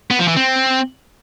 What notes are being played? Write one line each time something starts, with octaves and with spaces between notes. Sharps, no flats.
B3
F3
E3
C4